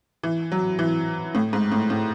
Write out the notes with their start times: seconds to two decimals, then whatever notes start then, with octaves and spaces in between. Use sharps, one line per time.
0.23 E3
0.52 F#3
0.79 E3
1.35 A2
1.53 G#2
1.72 A2
1.90 A2